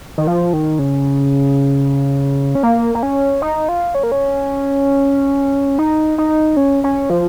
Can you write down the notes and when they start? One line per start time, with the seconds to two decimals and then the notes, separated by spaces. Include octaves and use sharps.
0.18 D#3
0.27 F3
0.53 D#3
0.79 C#3
2.55 C#4
2.63 A#3
2.95 A#3
3.03 C#4
3.42 D#4
3.69 F4
3.95 C#4
4.03 A#3
4.12 C#4
5.78 D#4
6.18 D#4
6.57 C#4
6.84 C#4
7.10 F3